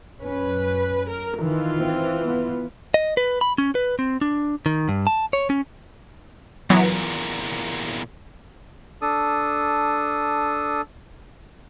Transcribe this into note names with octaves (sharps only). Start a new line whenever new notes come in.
F#2 C#4 B4
A#4
D#3 E3 F4
C4
B3
D#5
B4
B5
C#4
B4
C4
D4
D#3
G2
A5
C#5
C#4
E2 A#2 E3 F#3 B3
D4 A4 D#6